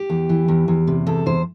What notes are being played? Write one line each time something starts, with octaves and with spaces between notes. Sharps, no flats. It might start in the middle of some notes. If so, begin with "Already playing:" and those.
Already playing: G4
E2
E3
E2
E2
C3
E2 A4
E2 C5